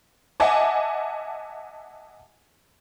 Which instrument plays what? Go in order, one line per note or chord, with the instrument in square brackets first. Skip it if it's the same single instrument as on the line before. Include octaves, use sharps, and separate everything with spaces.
[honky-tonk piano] D#5 E5 F#5 G#5 A5 D6